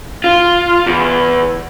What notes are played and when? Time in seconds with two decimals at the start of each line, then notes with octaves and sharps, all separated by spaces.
0.24 F4
0.86 E2